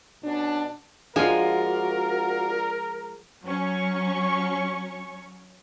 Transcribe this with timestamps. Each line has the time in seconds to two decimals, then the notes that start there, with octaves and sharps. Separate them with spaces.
0.24 B2 C#4 D4
1.16 F3 G#3 D4 F4 F#4 A#4 G#5
3.44 F#3 C#4 C#6